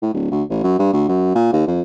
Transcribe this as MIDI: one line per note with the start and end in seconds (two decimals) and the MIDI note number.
0.02 0.11 45
0.14 0.30 26
0.31 0.43 38
0.50 0.61 33
0.63 0.75 42
0.79 0.89 43
0.93 1.07 38
1.08 1.34 42
1.35 1.49 46
1.53 1.66 39
1.67 1.82 41